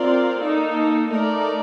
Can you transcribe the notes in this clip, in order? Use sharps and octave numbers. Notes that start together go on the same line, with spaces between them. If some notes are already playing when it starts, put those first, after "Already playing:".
Already playing: C4 F4 A#4 D5
A#3 D#4 A4
A3 D#4 A#4 D5